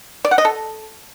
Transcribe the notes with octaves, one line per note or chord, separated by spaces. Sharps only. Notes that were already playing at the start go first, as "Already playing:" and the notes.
D5
F#5
D#5
A4